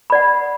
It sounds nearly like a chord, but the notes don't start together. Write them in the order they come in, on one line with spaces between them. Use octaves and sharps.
B5 D5 F#5